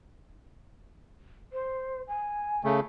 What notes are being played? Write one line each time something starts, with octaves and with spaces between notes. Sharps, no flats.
C5
G#5
C#3 A3